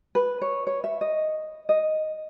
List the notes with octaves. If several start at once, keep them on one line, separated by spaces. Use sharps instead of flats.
B4
C#5
C#5
E5
D#5
D#5